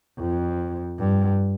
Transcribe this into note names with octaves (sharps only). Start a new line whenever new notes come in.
F2
G2